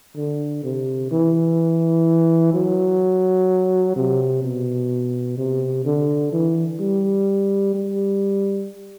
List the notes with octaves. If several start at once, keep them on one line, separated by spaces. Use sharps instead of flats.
D3
C3
E3
F#3
C3
B2
C3
D3
E3
G3
G3